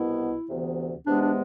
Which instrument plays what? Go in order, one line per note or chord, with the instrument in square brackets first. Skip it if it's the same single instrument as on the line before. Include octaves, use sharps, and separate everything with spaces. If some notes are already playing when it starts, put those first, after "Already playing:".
Already playing: [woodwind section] C2 B2 B3 E4
D2 C3 E3 B3
E2 C3 G#3 B3 D4
D4